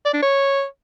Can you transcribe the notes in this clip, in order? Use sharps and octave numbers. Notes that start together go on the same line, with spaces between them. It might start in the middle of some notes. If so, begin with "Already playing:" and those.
D5
D4
C#5